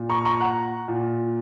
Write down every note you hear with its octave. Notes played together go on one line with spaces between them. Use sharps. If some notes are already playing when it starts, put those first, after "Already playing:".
Already playing: A#2
A#5 C#6
A#5 C#6
F#5 A#5
A#2